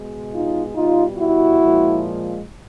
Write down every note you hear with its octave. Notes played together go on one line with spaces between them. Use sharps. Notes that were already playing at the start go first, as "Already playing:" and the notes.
Already playing: B2 G#3
D#4 F4
B2 G3 D#4 F4
E4 F#4
A#2 F3 G#3